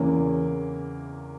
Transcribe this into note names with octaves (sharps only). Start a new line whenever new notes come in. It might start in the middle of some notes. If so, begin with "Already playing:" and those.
Already playing: E2 C#3 E3 A#3 C#4